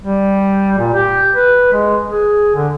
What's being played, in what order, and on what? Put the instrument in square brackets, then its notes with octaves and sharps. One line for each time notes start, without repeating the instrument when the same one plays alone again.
[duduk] G3
A#2
G4
B4
G#3
G#4
D3